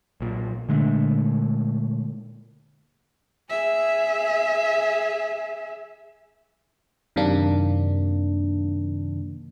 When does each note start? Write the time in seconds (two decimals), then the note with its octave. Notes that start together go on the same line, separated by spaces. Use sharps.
0.21 B1 A#2
0.69 A#2 D3 G#3 A3
3.49 G#4 E5
7.16 F#2 C3 D#3 A#3 D4